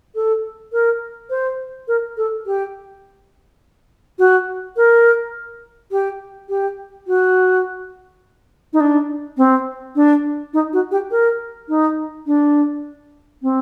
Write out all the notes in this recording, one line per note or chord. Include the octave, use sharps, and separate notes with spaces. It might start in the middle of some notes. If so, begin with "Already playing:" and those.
A4
A#4
C5
A#4
A4
G4
F#4
A#4
G4
G4
F#4
D#4
D4
C4
D4
D#4
F#4
G4
A#4
D#4
D4
C4